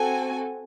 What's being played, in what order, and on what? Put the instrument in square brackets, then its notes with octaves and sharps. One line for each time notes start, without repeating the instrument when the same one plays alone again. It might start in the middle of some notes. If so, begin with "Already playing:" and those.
Already playing: [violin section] C4 F#4 A4 G#5